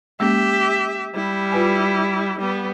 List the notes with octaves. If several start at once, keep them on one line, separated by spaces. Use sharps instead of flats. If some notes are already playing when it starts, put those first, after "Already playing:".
G#3 A#3 C#4 G4 E5
G3 E4
F4 B4 G#5
G3 B3